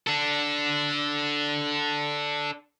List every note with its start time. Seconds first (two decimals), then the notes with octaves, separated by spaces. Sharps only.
0.07 D4 A4